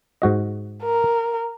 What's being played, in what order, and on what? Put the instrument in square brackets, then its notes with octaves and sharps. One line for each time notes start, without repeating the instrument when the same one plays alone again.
[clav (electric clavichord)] G#2 F#4 D#5
[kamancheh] A#4